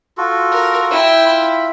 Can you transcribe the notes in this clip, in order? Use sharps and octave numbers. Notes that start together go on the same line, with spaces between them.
F4 F#4 A4
A#4
E4 G5
F4 E5 B5